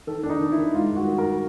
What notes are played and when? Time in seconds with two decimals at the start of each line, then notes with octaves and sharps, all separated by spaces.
0.07 D#3 A4
0.23 D#3 D4
0.29 D#4
0.41 D#3
0.52 E4
0.58 D#3
0.74 G#3 F4
0.91 G2
0.96 F#4
1.07 D#3
1.18 A#4